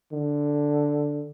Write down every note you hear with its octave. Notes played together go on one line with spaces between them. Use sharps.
D3